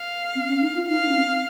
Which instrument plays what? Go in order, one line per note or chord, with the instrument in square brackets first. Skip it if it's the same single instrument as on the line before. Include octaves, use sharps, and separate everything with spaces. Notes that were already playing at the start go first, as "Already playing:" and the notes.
Already playing: [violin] F5
[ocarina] C4
C#4
D#4
F4
[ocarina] D#4 [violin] F5
[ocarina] D#4
C#4
C4